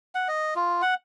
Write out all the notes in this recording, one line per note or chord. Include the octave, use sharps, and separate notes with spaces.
F#5
D#5
F4
F#5